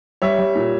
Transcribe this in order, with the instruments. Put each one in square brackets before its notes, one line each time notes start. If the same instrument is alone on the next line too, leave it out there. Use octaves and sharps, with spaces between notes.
[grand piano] G3 C#5 E5
G3
A#2